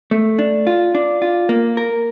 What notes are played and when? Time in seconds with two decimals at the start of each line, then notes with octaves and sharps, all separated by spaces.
0.11 A3
0.39 D4
0.67 F4
0.95 D4
1.22 F4
1.49 A#3
1.77 A#4